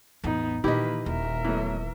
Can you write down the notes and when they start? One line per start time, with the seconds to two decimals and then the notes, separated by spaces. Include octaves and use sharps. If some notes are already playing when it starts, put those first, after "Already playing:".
0.24 A1 E2 B3 D#4
0.64 A#2 D#3 E3 A#3 E4 G4 B4 D#5
1.06 D#1 A#4 E5
1.44 E3 F#3 A3 B3